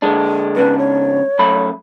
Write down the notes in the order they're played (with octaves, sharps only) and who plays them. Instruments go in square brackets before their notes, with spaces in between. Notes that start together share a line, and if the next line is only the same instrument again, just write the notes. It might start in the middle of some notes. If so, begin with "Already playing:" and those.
[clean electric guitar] D3 G#3 D4
[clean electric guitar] G#2 C#3 D4 [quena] B4
[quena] C#5
[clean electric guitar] F#2 A3 B5